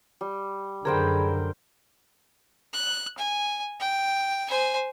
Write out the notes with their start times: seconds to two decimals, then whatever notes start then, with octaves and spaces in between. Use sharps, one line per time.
0.21 G3
0.85 F#2 D3 G#4 A#4 C5 G5 B5
2.74 F#6
3.18 G#5
3.80 G5
4.49 C5 G#5